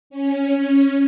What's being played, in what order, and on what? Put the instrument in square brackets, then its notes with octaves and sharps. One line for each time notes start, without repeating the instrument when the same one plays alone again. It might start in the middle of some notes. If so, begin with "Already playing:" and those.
[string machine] C#4